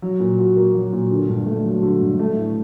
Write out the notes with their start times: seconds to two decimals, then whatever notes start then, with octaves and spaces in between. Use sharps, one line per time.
0.02 F#3
0.20 A#2
0.39 F#4
0.57 A#3
0.75 F#3
0.93 A#2
1.11 D3
1.29 G2
1.46 A3
1.65 F#3
1.83 D3
2.01 G2
2.19 A3
2.37 A2